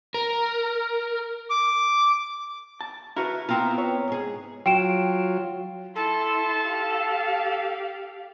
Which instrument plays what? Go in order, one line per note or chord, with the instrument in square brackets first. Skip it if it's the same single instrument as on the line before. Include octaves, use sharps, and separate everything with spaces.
[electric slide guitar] A#4
[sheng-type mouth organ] D6
[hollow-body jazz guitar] A5
[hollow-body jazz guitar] E4 F#4 B4 [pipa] A#4
[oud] B3 C4 E4 [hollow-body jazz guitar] F4 [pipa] A#4
[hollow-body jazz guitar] C#5
[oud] G#2 G#4
[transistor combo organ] F#3 F4 [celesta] G5 D7 E7
[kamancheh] E4 C6 [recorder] A4
[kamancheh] G4 F5